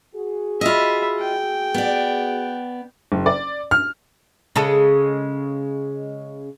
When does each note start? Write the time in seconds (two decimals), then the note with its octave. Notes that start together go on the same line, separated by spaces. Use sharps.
0.15 F#4 G#4
0.61 F4 D#5 E5 B5
1.19 G5
1.74 B3 D5
3.12 F#1
3.26 D5
3.71 F6
4.56 C#3 G#3 A4